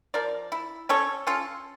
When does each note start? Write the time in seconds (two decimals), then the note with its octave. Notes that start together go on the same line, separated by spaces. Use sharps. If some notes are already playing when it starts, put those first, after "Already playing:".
0.14 F3 A#4 D5
0.52 E4
0.89 C#4 A4 C#5
1.27 C#4 F4 A4